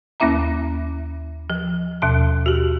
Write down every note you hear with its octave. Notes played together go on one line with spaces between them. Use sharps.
D#2 A#3 C#4 E4 E5 A#5
F3
D#2 B2 A5
F#4 G4